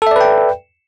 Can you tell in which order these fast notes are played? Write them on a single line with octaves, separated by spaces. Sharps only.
A4 E5 D5 B4 G5